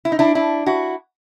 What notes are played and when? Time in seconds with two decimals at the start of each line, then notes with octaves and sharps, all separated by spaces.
0.05 E4
0.12 D#4
0.19 D4 E4
0.35 D4 E4
0.66 E4 F#4